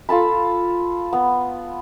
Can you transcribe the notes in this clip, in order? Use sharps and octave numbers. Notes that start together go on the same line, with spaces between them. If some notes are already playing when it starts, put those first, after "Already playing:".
F4 A4 A5 B5
B3